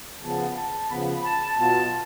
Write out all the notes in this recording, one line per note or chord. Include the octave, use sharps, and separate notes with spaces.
C#3 F3 B3 A5
A5
C#3 F3 B3 B5
A5
B2 F#3 B3 F4 A5